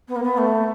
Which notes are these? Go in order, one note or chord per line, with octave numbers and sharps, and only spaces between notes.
B3
A#3
B3
A3